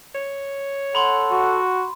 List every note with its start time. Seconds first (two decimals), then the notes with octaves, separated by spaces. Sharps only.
0.15 C#5
0.95 A4 F#5 B5 C6
1.31 F#4